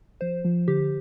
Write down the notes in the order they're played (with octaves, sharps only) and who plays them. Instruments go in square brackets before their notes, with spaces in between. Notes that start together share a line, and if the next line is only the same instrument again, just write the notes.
[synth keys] F3 [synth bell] C5
[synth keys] F3
[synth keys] D3 [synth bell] G4